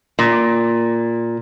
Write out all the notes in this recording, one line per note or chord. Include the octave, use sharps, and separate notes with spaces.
A#2